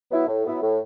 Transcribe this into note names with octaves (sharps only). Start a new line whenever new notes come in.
F#3 B3 E4
A2
F#3 B3 E4
A2